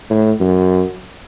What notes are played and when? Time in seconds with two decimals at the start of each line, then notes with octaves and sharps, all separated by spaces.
0.10 A2
0.40 F#2